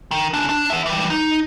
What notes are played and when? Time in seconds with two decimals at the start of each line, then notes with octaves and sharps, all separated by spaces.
0.11 D#3
0.34 C#3 D4
0.49 D4
0.70 B3 E5
0.86 E3 G3
1.10 D#4